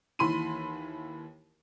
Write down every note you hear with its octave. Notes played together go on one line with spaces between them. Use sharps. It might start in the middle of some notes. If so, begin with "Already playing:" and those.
D#2 E3 B5 C6 D#7